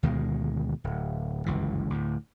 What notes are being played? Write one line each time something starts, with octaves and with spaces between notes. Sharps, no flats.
D2 B2 D#3 G#3
D1
G1 C#2 F#2 E3
D2 A2